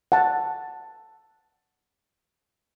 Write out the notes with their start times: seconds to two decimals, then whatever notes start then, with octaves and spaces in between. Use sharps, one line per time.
0.12 F#5 A5